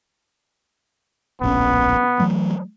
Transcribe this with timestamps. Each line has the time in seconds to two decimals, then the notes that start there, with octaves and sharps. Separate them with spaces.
1.41 D1 A#1 B3 C#4
2.19 E3 F#3 A3